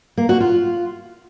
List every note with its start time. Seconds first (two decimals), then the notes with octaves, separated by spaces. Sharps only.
0.17 A#3
0.29 F#4
0.40 F4